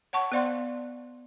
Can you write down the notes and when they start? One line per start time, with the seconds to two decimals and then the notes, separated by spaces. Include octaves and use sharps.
0.13 C#5 F#5 A5 C#6
0.32 B3 C5 D5 F5 C6